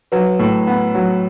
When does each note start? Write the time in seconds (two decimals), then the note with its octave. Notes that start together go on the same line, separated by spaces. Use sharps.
0.12 F#3 B4
0.39 A2
0.67 B3
0.94 F#3